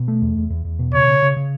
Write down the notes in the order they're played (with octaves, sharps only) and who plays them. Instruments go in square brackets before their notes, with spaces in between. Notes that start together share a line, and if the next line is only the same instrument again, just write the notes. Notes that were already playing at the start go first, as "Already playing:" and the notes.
Already playing: [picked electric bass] B2
A3
E2
E2
E2
E2
B2
[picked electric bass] C#3 [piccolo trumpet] C#5
[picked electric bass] C#3
C#3
C#3